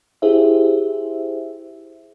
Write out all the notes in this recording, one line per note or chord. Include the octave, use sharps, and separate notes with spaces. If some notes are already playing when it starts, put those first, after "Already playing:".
E4 G4 G#4 C5 E5